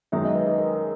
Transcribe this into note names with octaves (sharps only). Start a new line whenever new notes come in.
F#2 D#3 G#3 D#4 E5
D#5
B4
G#4
A#4
A#4